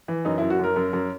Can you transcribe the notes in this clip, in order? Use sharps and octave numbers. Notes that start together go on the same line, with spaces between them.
E3
F#2 D#4
F#2 E4
F#4
F#2 A#4
F#2
F#2